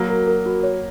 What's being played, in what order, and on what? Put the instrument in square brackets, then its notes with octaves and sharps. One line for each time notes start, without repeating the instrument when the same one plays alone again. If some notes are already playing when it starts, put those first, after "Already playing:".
Already playing: [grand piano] F#3 A#3 [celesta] F#4
[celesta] A#4
A#4
F#4
C#5